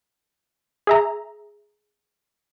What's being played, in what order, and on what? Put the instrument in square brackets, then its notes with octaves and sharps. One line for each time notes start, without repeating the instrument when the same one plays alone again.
[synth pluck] G#4 E5 A#5